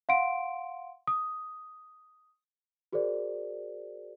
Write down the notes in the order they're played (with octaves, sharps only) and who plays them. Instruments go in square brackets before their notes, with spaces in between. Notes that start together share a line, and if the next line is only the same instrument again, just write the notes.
[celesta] F5 F#5 C6 D7
D#6
F#4 G#4 A#4 C5 D5